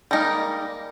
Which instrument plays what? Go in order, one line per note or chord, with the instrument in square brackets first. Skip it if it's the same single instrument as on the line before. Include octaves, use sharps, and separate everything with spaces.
[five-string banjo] G3 G#3 A#3 D#4 A#4